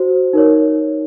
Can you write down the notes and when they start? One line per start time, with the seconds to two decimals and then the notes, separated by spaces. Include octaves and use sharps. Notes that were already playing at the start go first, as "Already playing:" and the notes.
Already playing: F#4 C5
0.33 D#4 A#4 C#5